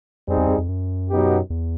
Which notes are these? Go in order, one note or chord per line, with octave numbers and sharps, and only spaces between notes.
F2 G3 C4 D#4 G#4
E2
F2
F2
F#2
B2 F#3 B3 D#4 G4
E2